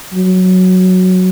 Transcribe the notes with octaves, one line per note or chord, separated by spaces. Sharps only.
F#3